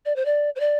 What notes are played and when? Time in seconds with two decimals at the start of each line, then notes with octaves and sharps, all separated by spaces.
0.05 D5
0.16 C5
0.25 D5
0.56 C5
0.60 D5